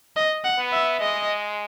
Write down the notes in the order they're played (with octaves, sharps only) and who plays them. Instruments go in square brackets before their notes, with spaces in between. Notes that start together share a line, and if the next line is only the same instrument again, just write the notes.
[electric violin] D#5
F#5
[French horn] B3
[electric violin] E5
[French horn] G#3 [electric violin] D#5